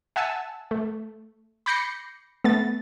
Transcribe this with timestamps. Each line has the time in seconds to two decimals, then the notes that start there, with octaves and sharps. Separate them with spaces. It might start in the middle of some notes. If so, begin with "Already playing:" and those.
0.16 E5 F#5 G#5 A5 E6
0.71 A3
1.66 B5 D6 G6 A#6 C7 C#7
2.44 A3 B3 A6